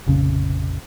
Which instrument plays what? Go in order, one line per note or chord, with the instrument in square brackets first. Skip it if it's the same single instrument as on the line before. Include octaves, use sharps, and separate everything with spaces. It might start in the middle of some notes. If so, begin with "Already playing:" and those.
[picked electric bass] F1 A#1 C#3